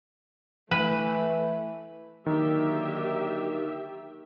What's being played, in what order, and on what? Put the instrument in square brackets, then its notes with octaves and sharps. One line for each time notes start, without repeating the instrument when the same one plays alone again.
[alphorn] E3 [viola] A3 [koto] B4
[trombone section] D3 F#3 A#3 [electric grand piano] D#3 [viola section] G4 E5